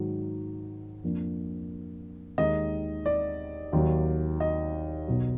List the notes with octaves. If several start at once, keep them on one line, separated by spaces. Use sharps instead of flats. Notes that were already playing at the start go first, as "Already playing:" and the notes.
Already playing: G#2 D#3 F#3
F2 F3 A#3 D4
D#2 D#3 G#3 D#4 D#5
D5
D#2 D#3 F#3
D#5
B1 B2 F#3